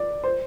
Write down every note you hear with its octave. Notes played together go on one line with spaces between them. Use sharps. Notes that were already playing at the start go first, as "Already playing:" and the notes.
Already playing: D5
C5